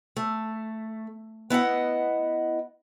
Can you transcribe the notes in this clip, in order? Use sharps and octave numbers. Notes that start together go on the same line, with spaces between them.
A3
B3 E4 D#5 F#5